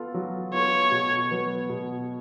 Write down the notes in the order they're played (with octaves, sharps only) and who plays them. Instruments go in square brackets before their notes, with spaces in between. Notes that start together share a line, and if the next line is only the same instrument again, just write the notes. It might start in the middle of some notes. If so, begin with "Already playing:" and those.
Already playing: [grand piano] B3 F4 A4
F#3
[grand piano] B3 F4 A4 [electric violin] C#5
[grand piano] B2
F#3 B3
B2